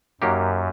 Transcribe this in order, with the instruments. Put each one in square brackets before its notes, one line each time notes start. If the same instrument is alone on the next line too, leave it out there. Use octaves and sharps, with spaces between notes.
[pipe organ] F#2 [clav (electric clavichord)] F#3 A#3 D#4 G4